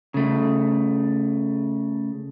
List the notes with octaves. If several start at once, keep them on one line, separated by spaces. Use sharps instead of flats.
C#3 A3